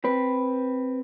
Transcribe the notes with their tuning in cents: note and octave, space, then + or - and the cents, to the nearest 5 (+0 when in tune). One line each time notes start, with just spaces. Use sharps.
C4 +0 B4 +0